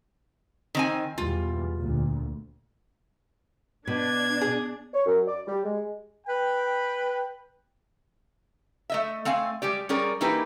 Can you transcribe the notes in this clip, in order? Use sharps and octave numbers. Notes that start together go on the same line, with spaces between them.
D#3 C4 G#5
E2 B2 G3 F4
D2 A#2
B2 D4 G#6
G#4
C#5
F#2
D5
G3
G#3
B4 G5
A3 D#5 E5
A3 C4 F5 G#5
G3 G#3 G4 D5
G3 C#4 G#4 A#4 D5
E3 A#3 D#4 E4 G4 B4